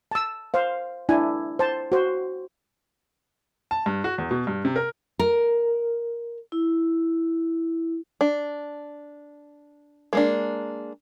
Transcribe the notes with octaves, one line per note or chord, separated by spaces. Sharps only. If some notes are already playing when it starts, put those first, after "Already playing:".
A5 E6
C5 F5
D4 E4 G#5
C5 A5
F#4 C5
A5
G2
F#4
E2
B2
G2
C3
A#4
A#4
E4
D4
G#3 A#3 D4